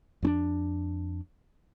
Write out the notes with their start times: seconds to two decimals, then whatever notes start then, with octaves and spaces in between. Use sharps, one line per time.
0.23 F2 C#4 D4